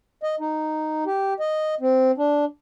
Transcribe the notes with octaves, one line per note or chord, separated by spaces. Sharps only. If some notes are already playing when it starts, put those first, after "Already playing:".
D#5
D#4
G4
D#5
C4
D4